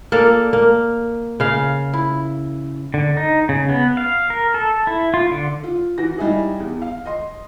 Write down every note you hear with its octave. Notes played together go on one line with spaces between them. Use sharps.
A#3 A4 D5
A#3
C#3 F5
E4
D3
D#4
C#3
B3
F5
A#4
A4
E4
F4
D3
F4
E3 F#4 A#6
G3 D#4 E4 G#4
E2
F5
D#5 C6